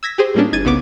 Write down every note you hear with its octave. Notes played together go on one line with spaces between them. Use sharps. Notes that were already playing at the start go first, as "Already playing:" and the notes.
E6 G#6 A#6 B6
G4 G#4 C5
A2 G3 A#3 C#4 D4
G1 D#4 G#6 A6 D#7
C2 C#3 B3 D6